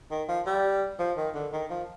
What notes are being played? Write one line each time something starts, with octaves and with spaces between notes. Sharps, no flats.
D#3
F3
G3
F3
D#3
D3
D#3
F3